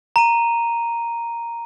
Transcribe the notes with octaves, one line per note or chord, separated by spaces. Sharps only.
A#5 D#7